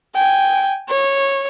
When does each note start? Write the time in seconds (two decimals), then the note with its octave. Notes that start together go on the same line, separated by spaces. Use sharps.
0.15 G5 G#5
0.89 C#5